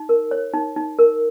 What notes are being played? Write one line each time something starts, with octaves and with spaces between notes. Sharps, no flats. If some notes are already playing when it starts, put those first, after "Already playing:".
Already playing: D#4
A#4
C#5
D#4
D#4
A#4